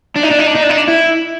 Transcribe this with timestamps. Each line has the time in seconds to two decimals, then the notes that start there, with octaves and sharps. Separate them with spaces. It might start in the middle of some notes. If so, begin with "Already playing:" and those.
0.16 D4
0.24 D#4
0.31 D4
0.40 D#4
0.47 D4
0.56 D#4
0.63 D4
0.70 D#4
0.78 D4
0.88 E4